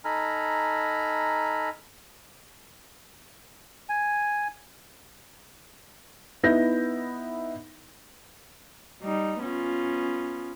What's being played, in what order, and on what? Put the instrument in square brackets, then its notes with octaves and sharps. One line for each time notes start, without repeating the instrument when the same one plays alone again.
[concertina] D#4 A4 G#5 A#5 B5 F6
G#5
[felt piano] B3 D#4 E4 G6 A#6
[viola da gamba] G3 D#4
B3 C#4 F4